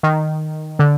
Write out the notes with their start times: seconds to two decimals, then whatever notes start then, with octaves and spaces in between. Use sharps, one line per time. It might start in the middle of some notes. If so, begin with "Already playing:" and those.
0.03 D#3
0.79 D3